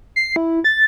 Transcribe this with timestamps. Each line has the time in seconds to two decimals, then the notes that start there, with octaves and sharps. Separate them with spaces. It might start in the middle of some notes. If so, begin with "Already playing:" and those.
0.16 C7
0.36 E4
0.64 A6